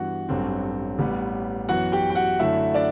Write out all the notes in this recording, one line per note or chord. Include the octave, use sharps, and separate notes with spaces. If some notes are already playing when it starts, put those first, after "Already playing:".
Already playing: G2 E3 B3 F#4 F#5
A1 G2 F#3 A3 C4
A1 A2 G3 B3
F#2 E3 B3 F#4 F#5
G4 G5
G5
F#4 F#5
F#2 D3 F#3 A3 E4 E5
D4 D5